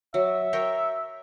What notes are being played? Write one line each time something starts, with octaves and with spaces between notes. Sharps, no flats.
F#3 E5
A#4 C#5 G5